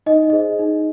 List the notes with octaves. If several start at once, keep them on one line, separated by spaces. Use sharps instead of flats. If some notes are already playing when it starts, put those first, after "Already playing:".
D#4 D#5
G#4 C5 D#5
D#4